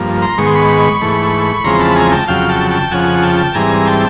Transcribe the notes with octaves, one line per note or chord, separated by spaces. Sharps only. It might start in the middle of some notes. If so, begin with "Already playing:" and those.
Already playing: G2 F3 A#3
A#5 C6
G#2 D#3 G#3 B3 C#6
C6
B5 C#6
G#2 E3 A3
E2 C#3 F3 G#3 C4 A#5 C6
A5 B5
G#5 A#5
G5 A5
F2 C#3 F#3 F5 G5
G5 A5
G5 A5
F2 C#3 F3 F#5 G#5
G5 A5
G#2 E3 G3 C4 G#5 A#5
G5 A5